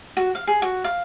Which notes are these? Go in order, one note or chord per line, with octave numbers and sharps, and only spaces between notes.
F#4
F5
G#4
F#4
F5